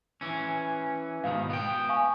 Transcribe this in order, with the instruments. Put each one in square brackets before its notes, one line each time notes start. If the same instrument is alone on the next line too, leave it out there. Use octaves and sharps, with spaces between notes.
[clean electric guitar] E3 C#4
[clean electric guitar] G#2 B2 D#3 [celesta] F5
[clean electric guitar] B3 G5
[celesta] F5 G#5 C#6